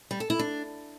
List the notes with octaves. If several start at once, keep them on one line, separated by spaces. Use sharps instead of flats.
G3
A4
E4
D4